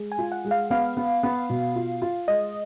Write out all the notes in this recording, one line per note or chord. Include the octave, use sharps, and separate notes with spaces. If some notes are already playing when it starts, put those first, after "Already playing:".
Already playing: G#3
G#5
F4
F#5
G#3
F5
B3 F5
B3
B3
B2
F4
F4
G#3 D#5